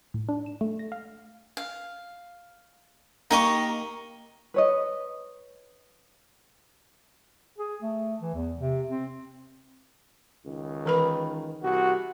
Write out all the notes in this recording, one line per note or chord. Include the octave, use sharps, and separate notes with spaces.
A2
D4
E7
A3
A#6
F5
F5
A#3 D#4 G4 D#5 C#6
B4 C#5 D#5
G#4
A3
E3
E2
C3
C4
C#2 D#3
E3 B4 B5
C2 F#4